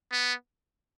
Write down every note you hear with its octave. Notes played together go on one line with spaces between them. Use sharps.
B3